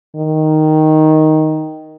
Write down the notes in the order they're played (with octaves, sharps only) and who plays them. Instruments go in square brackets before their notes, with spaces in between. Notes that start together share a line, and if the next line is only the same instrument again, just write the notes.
[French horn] D#3